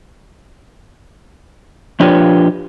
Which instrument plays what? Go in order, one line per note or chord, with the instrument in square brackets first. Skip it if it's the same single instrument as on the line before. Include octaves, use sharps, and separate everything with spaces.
[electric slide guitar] F3 D4 F4 G4 B4 C#5